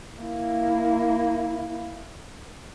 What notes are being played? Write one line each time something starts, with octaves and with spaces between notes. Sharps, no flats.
A#3 E4